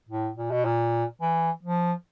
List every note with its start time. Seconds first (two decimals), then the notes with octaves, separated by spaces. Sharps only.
0.09 A2
0.37 A#2
0.51 B2
0.65 A#2
1.21 E3
1.63 F3